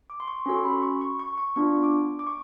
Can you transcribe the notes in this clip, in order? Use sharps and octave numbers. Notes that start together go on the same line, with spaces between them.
D6
C6
C#6
C#4 F#4 A4 C6
B5
C#6
C#6
C#6
C#6
B3 D4 F4 C#6
D6
D6
C#6